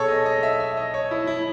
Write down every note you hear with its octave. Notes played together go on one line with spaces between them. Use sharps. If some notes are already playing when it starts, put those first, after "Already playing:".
Already playing: B2 G#4 A4 C#5
D#5
D#5
E5
E5
D#5
C#5
E4
E4